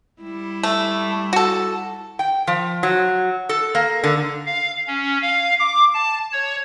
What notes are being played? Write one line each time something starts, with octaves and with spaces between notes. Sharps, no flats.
G3 E4
A3
F#4 A4
G5
F3
F#3
A4
A#3
D3
F5
C#4
F5
D6
A5
C#5